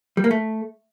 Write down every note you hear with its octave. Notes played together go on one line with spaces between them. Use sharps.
G3
A#3
A3